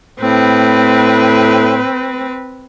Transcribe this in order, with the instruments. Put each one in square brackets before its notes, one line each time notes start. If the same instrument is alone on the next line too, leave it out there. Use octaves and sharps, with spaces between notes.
[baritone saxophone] A2 [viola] C4 B4